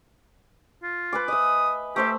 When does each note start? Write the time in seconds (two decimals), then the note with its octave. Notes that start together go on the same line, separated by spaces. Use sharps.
0.83 F4
1.13 B4 G#5 D6
1.28 D#5 E5 D#6
1.96 A3 G4 C5 E5